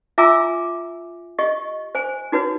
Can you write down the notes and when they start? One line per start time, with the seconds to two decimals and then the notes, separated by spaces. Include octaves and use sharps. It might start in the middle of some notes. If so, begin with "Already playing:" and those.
0.18 F4 E5 G#5 A#5 D6 E6
1.39 G4 D#5 C#6
1.95 C5 G#5
2.32 D#4 F#4 B4 C#5